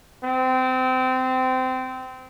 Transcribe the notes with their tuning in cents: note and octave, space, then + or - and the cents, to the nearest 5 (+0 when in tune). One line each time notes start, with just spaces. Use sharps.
C4 -25